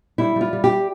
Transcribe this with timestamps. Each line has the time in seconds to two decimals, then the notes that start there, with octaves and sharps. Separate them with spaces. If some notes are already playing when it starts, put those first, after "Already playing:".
0.18 G3 E4
0.36 G3 F4
0.53 G3
0.64 G4